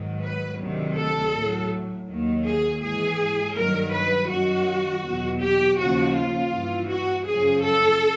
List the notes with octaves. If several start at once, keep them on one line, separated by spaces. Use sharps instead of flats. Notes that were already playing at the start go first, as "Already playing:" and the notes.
Already playing: G#2 D#3 F#3
B4
D2 C3 D#3 F#3
A4
A2 F#3
D#2 D#3 F#3
G#4
G#2 E3 G#4
G2 D#3 F#3 A#4
B4
F#2 D#3 F#3 F#4
E2 B2 F#3
G4
D#2 C#3 F3 F#4
F4
G2 E3
F#4
F#2 C#3 F3 G#4
A4